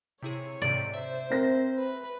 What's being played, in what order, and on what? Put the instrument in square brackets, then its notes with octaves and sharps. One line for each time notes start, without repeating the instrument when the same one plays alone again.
[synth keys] C3 E4 G#4 [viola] C#5
[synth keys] G#2 C3 [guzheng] D5
[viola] C5 [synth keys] E5
[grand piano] C4 A#4 A#6
[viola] B4